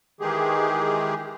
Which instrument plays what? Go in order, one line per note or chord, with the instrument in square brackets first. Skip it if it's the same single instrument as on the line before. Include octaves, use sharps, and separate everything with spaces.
[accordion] D#3 E3 G#3 G4 G#4